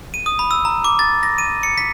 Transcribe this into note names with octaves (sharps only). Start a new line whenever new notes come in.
D#7
D#6
B5
E6
A#5
D6
A6
A#6
D#7
C#7
B6